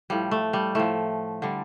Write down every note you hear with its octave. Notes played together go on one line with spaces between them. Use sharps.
A2 F3 G3
A3
G3
A2 F3 A3
D3 G3